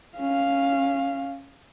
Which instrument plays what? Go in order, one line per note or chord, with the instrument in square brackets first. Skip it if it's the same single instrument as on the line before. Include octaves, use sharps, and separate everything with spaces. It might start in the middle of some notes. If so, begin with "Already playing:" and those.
[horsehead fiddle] C#4 F5